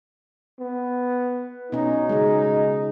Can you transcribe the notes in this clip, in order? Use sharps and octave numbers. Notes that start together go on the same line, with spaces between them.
B3
B2 C#4 D#4
C#3 G#3